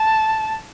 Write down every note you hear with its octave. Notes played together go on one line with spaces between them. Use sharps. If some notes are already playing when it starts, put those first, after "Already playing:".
Already playing: A5